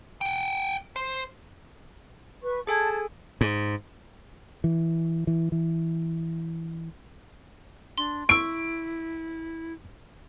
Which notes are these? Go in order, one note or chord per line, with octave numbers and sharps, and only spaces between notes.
F#5 G5
C5
B4 C#6
G#4 A4 G#5 A5 G#6
G#2
E3
E3
E3
D4 C6
E4 C#6 E6 D7